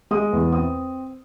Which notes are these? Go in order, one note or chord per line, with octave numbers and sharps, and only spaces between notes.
G#3 D#6
E2
C4 D#6